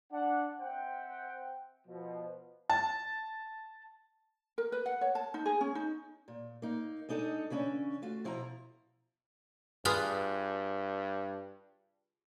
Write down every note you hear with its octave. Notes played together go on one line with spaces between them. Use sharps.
D4 F#5
C4 C5 E5 F#5 G5
B2 F3
A5
A#4
B4
F#5
C#5
A5
D#4
G#4
C#4
D#4
A#2
A#3 D#4
G#3 D4 D#4 A4 D#5
C#3 E3 C#4 D4
A3 F4 F#4
B2 F3 E4 C5 A#5
G2 F4 G#4 B4